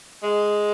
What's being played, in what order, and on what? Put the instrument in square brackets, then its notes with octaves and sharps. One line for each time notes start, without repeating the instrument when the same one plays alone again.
[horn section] G#3